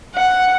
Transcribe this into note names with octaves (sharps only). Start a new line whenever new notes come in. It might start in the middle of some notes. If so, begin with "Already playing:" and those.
F#5